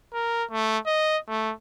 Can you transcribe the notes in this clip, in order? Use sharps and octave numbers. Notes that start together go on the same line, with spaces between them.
A#4
A3
D#5
A3